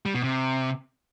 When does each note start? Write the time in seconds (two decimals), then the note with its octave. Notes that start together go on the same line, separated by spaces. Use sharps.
0.06 G3
0.15 B2
0.24 C3